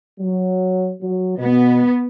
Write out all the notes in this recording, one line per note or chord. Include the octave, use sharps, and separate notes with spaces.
F#3
F#3
B2 B3